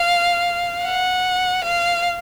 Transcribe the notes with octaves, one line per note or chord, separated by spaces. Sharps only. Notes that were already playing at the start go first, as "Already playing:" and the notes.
Already playing: F5
F#5
F5